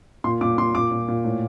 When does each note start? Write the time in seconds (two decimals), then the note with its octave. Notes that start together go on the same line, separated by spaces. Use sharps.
0.24 A#2 C6
0.41 A#2 D6
0.58 A#2 C6
0.75 A#2 D6
0.91 A#2
1.08 A#2
1.25 A2